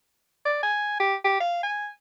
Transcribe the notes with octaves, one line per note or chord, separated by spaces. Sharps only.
D5
G#5
G4
G4
F5
G#5